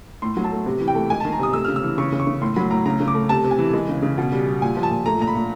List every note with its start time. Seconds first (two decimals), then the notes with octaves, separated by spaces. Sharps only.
0.22 A2 C6
0.37 F#3
0.44 A5
0.51 A3
0.66 C3
0.81 E3
0.88 G5
0.95 A3
1.10 G#3 G#5
1.20 A5
1.25 D#3
1.32 A#5
1.39 C3 D#6
1.53 A3 E6
1.65 F6
1.68 C#3
1.76 E6
1.83 E3
1.98 C#3 C#6
2.12 C#3
2.20 C#6
2.27 C#3
2.41 A2 C6
2.56 F#3 B5
2.71 A2 A#5
2.86 C#3 A#5
3.00 C#3
3.08 D6
3.14 A3
3.29 C3 A5
3.44 C3
3.51 G#5
3.59 E3
3.73 G#3
3.89 C#3
4.02 C#3
4.18 B2
4.32 G3
4.46 G3
4.62 A#2 G#5
4.77 F3
4.83 A5
4.91 A#2
5.06 A3 A#5
5.20 A#2 A#5
5.27 B5
5.35 A#2